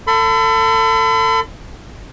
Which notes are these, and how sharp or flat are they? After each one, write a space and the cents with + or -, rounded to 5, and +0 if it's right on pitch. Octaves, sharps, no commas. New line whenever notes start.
A4 +30 B5 +45